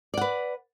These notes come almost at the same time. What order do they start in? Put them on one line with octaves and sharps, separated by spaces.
D5 F#5 B4